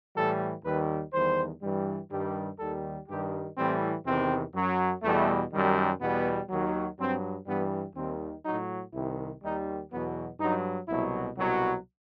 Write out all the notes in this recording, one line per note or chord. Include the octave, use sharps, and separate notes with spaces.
A2 E3 G3 A4
D#2 D#3 G3 B4
E2 D#3 G3 C5
G2 E3 G3
G2 D#3 G3
D#2 D#3 G3 A4
G2 D#3 G3 G4
A2 E3 G3 C4
E2 C3 D#3 C4
F#2 F#3
E2 B2 G3 A3
F#2 D#3 G3
E2 B2 G3 B3
D#2 D#3 F#3
G2 F#3 C4
G2 E3 G3 B3
D#2 D#3 G3 C4
A2 F#3 D#4
C2 C3 D#3 E4
D#2 D#3 G3 D#4
E2 B2 F#3 B3
G2 F#3 D#4
C2 B2 F#3 E4
C2 B2 F#3